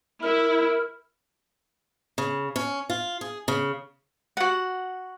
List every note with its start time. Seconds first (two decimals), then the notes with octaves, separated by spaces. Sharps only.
0.23 E4 A#4
2.18 C#3
2.56 C#4
2.90 F4
3.21 G#4
3.48 C#3
4.37 F#4 F#5